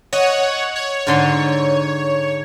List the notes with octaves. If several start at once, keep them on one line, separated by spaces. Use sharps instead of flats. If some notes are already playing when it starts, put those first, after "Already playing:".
C#5 D#5 F#5
C#5
G#2 D3 C6